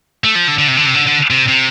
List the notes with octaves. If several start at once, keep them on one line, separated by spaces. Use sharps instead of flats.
A3
F3
D3
D3
C3
D3
C3
D3
D3
C3
C3